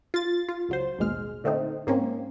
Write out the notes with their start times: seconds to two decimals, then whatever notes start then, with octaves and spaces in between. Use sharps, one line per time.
0.14 F4 A6
0.49 F4
0.69 C#2 F#3 C5
0.99 A1 D#2 B2 G#3 F6
1.44 A#2 D3 A3 C4 D#4
1.87 G#2 A#3 C4 C#4